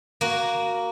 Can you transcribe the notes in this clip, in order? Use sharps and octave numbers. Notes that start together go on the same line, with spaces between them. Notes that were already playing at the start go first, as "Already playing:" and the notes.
A#3 F#4